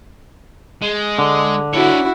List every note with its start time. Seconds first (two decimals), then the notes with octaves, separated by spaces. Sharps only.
0.82 G#3
1.18 D3
1.73 D4 E4 F#4 C#5